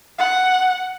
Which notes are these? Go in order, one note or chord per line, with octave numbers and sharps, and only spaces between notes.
F#5